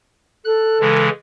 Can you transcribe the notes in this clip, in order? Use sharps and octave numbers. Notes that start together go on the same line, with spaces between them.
A4 F#6
C#3 E3 G#3